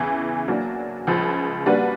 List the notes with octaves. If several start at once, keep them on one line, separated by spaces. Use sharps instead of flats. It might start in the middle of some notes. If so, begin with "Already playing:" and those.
Already playing: E2 C#3 E3
F#3 A#3 D4
C#2 C#3 F3
G3 A#3 D4 F#4 B4